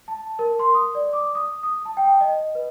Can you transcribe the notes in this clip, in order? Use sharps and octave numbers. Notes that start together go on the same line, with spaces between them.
A5
A#4
C6
D#6
D5
D6
D#6
D#6
A5
G5
D#5
B4